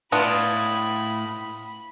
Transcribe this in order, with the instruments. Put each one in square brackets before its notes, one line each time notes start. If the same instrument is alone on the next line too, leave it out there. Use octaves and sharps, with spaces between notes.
[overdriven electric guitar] A2 [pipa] B3 D4 F4 [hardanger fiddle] B5 [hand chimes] D#6